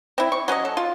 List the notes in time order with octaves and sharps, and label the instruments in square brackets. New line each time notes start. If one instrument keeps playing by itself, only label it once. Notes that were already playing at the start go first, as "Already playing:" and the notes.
[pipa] C4 E4
C#6
F#3 C#4 B4 D#5
A4
F4